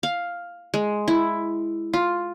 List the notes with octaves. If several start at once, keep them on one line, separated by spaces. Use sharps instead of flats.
F5
G#3
E4
F4